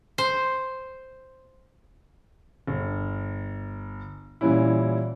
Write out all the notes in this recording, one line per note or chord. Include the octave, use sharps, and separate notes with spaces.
C5
G1
A#2 E3 G3 C#4 E4